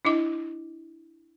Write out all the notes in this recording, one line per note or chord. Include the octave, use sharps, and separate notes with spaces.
D4 E4 D#5 D6